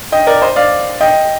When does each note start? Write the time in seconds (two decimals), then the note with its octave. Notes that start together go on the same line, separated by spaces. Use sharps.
0.12 D#5 G5
0.27 A#4 D5
0.42 C5 D#5
0.56 D5 F5
1.01 D#5 G5